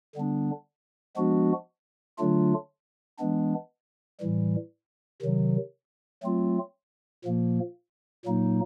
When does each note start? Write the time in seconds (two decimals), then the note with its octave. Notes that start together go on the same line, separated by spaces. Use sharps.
0.15 D3 G3 B3 D4
1.17 F3 G#3 B3 D4 F#4
2.18 D3 F#3 A3 D4 F4
3.19 E3 G#3 B3 D4
4.20 A2 E3 G3
5.22 C3 D#3 F#3
6.23 F#3 A3 C4 F4
7.24 A#2 F3 A#3
8.25 A#2 F#3 A#3 D#4